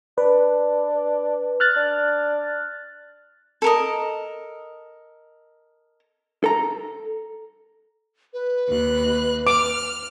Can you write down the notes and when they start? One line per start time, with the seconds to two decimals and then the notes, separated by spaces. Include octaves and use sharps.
0.18 D4 B4
1.60 F6 F#6 A6
1.76 D4
3.62 A4 A#4 D#5
6.44 A4 A#5
8.33 B4
8.69 D#2 F#6
9.47 D6 F6